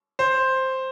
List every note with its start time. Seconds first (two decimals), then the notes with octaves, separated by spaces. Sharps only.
0.19 C5